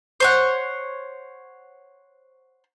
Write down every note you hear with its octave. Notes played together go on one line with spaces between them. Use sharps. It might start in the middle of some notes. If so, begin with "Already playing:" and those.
C5 C#5 F#5